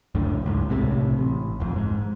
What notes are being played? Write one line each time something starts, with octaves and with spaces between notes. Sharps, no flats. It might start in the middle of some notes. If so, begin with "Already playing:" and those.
C#2 F#2 A2 D3
D2 G#2
B1 A2 C3
A1
D#1 F2
G#2